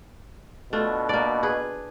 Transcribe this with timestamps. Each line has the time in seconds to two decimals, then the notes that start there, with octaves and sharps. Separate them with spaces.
0.73 B2 A3 D4 F4
1.09 A#3 D5
1.43 G#4 B4